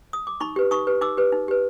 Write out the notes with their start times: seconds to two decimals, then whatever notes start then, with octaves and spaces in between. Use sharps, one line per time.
0.13 D#6
0.27 D6
0.40 D#4 B5 C#6
0.56 G4 B4
0.71 D#4 C#6 D#6
0.87 G4 B4
1.01 D#4 D6 E6
1.17 G4 B4
1.32 D#4
1.48 G4 B4